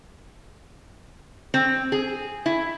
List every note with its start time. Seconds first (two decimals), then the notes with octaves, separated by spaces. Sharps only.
1.54 C4
1.92 G#4
2.46 E4